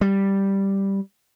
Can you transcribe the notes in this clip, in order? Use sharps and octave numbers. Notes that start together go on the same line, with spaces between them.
G3